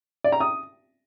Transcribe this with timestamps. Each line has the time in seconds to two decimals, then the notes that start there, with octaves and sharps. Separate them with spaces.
0.24 D5
0.32 A#5
0.40 D#6